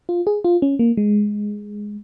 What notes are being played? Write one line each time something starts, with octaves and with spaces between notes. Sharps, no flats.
F4
G#4
F4
C#4
A#3
G#3